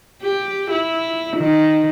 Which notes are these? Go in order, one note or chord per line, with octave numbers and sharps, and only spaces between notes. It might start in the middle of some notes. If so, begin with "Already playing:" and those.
G4
E4
D#3